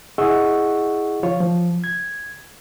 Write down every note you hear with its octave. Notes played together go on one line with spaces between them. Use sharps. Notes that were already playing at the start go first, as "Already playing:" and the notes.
E4 G#4 D#5 F#5 C#6 E6
F3 F4 C#5
F3
G#6